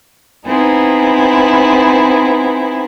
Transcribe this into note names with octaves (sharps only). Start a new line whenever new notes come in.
B3 C4 D#4 E4 G#4